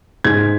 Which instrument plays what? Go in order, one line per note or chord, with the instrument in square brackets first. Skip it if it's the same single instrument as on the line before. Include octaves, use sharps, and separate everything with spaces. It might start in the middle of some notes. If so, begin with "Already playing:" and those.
[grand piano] G#2 G#6